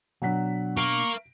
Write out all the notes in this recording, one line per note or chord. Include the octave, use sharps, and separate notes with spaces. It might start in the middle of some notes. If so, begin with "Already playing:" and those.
B2 F#3 D4 F#5 B6
A#4 F5 C#6 D7